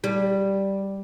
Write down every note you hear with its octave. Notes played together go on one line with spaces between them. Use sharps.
G3